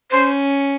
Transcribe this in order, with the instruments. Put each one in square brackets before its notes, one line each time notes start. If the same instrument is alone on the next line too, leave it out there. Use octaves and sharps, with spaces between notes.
[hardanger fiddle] C#4 [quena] C5